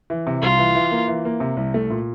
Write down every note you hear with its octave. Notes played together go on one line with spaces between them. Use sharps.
E3
C3
C2 F4
E3
E3
A#3
E3
A#3
C3
C2
A3
A#2